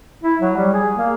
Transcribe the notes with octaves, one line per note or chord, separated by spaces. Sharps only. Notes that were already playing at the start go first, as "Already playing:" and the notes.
E4
F#3
G3
G#4
A#3